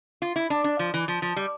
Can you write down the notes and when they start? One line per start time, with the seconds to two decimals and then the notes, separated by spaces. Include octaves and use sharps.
0.22 F4
0.36 E4
0.50 D4
0.64 D4
0.79 F3
0.94 E3
1.08 F3
1.22 F3
1.36 G3